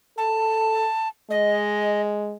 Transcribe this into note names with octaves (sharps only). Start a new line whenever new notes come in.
A4 A5
G#3 D#5